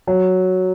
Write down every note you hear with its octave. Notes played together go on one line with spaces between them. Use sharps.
F#3